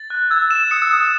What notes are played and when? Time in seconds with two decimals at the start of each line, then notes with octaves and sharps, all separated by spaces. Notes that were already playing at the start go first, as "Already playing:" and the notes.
Already playing: A6
0.10 F#6
0.30 E6 G#6
0.51 E7
0.71 D#6 C#7
0.82 E6
0.92 D#6 C#7